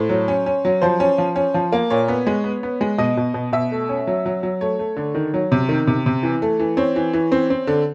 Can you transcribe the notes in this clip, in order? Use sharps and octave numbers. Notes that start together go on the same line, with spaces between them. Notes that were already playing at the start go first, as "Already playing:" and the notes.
Already playing: A2 C5
F#3
C#4
C#4
F#3
F3 C5
C#4
F3
C#4
F3
A#3
A#2 C#5
B3
G#3
B3
B3
G#3
B2 D#5
B2
B2
B2 E5
A3
C#4
F#3
F#3
F#3
A3 C#5
A3
D3
D#3
F#3
C3
D#3
C3
C3
E3
A3
E3
C4 C#5
E3
E3
C4
C4
D3